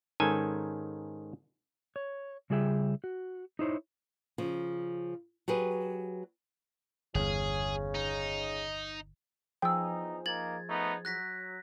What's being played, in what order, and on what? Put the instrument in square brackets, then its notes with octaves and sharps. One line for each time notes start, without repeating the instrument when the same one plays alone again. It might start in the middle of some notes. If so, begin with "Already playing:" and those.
[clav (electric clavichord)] G#2 D#3 C#4 A4 G#5
[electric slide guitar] C#5
C#3 G3 F4 G#4 E5 G5
F#4
D#4 E4 C5 C#5
[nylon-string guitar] C#3 F3
F#3 G4 G#4 B4
[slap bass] G1 E2 [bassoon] C#3 [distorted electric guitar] G#4
[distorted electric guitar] D#4
[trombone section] E2 D#4 [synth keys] F3 G#4 C5 [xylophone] G5 E6
[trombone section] A#3 D#4 [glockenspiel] G#6 A6 [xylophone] F#7
[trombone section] A3 B3 D#4
[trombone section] F#3 [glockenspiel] F#6 A#6 B6